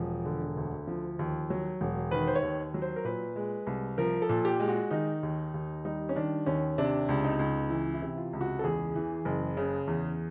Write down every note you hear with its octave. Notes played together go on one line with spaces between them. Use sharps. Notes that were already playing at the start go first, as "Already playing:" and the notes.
Already playing: E1 F3
D3
D2
F3
D#2
F#3
E1
D#3 B4
C5
C#5
D#2
F#3
C5
A#4
A#2 B4
G#3
C2
F3 A#4
A4
A#2
G4
G#3
F#4
D#3 D#4
D#2
D#2
G3 D#4
C#4
D#3 D4
D#2 C#4
C3 D4
C#2
D#4
C#2
E3 E4
E4
C3
F4
C#2
F#4
A4
E2 G#4
E3
F#1
C#3
E2